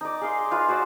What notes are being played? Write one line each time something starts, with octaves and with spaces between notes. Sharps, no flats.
D#4 D5
G#4 F5 C6
D#4 F4 B4 F5
F#4 C5 D5